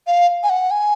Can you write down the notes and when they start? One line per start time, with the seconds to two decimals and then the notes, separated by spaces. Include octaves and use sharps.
0.07 F5
0.43 G#5
0.49 F#5
0.71 G#5